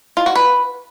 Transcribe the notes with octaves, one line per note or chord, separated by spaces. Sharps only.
F4
F#4
B4